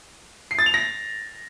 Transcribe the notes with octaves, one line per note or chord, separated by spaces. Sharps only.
C7
A6
F7
A#6